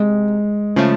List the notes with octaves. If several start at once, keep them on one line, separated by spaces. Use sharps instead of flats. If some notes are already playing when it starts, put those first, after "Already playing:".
Already playing: C3 G#3
C#3 F3 A3